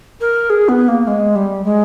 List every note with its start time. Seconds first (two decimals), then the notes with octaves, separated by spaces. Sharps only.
0.21 A#4
0.50 G#4
0.69 B3
0.88 A#3
1.07 G#3
1.36 G3
1.65 G#3